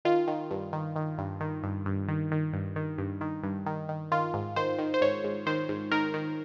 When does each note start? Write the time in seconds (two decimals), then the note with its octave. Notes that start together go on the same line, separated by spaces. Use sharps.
0.05 D#3 F4
0.28 D#3
0.51 G2
0.73 D#3
0.96 D#3
1.18 G2
1.41 D#3
1.63 G2
1.86 G2
2.08 D#3
2.31 D#3
2.53 G2
2.76 D#3
2.98 G2
3.21 D#3
3.44 G2
3.66 D#3
3.89 D#3
4.11 D#3 F4
4.34 G#2
4.56 D#3 C5
4.79 D#3
4.94 C5
5.01 G#2 C#5
5.24 G#2
5.46 D#3 C5
5.69 G#2
5.91 D#3 A#4
6.14 D#3